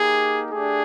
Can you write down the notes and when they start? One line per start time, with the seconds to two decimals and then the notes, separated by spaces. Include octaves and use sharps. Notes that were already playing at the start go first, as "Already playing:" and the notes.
Already playing: A#3 D#4 G4 G#4
0.50 A3 D4 G4 G#4